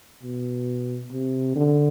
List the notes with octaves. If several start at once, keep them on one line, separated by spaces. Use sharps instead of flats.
B2
C3
D3